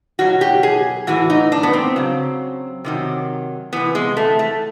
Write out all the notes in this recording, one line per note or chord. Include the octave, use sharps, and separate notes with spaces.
B2 F#3 F#4
G4
G#4
A2 E3 F#4
D#4
D4
B3
C4
C#3 F#3
C3 D#3 F#3
C3 E3 B3
G#3
A3
A3